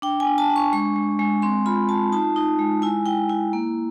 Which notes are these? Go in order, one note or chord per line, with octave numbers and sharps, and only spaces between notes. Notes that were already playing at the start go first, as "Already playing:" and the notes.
D4 G5
G#5
D4
A5
D4
C#6
G#3 C#6
G#3
G#3
C4 C6
F4 B5
F4 A5
D#4 A5
D#4
G#3
E4 G#5
E4 G5
E4
A#3